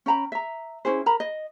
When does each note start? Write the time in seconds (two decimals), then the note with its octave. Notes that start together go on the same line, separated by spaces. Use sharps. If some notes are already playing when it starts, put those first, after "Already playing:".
0.06 C#4 G5 A#5 B5
0.32 E5 A#5
0.85 C#4 E4 G#4 C5
1.06 A#4 A#5 B5
1.20 D#5